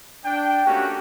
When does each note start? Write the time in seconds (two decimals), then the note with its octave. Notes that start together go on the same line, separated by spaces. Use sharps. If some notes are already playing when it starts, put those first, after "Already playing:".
0.24 D4 G5
0.66 A3 A#3 C#4 F#4 G4